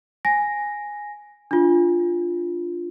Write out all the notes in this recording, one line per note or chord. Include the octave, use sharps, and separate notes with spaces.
G#5 A#6
D4 F4